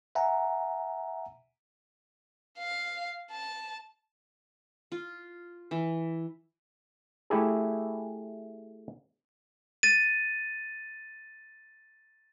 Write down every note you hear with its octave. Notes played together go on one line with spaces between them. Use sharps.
E5 F#5 G#5 A#5
F5
A5
F4
E3
A3 E4 G4 G#4
A6 D#7